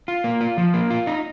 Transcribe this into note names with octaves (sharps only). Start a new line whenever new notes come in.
F4
A#3
F4
F3
A#3
F4
D#4